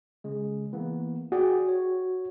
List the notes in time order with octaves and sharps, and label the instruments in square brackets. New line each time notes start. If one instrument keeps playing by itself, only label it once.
[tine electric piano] C#3 G#3
E3 A#3 B3
[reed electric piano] F#4 [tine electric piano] G#4 D5 G5
[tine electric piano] C#5